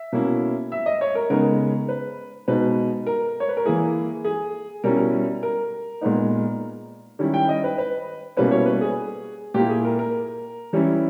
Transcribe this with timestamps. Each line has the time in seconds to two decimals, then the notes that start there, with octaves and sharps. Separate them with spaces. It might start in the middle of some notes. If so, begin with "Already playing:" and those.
Already playing: E5
0.12 B2 A#3 C#4 E4
0.72 E5
0.86 D#5
1.01 C#5
1.15 A#4
1.30 C#3 G#3 B3 D#4 A#4
1.89 B4
2.48 B2 G#3 D#4 B4
3.06 A#4
3.40 C#5
3.49 B4
3.57 A#4
3.65 E3 A#3 E4 G#4
4.25 G#4
4.84 B2 G3 C#4 E4 A#4
5.43 A#4
6.01 A#2 G#3 B3 D#4
7.19 D#3 G3 C#4 E4
7.34 G5
7.49 D#5
7.64 B4
7.78 B4
8.37 B2 G3 A#3 C#4 E4 B4
8.51 C#5
8.66 B4
8.81 G#4
9.54 A#2 A#3 E4 G4
9.69 G#4
9.85 A#4
9.99 A#4
10.73 E3 G3 C#4 E4